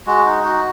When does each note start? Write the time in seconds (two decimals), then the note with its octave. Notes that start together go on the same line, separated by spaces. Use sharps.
0.07 G#3 F#4
0.25 D#4
0.44 F#4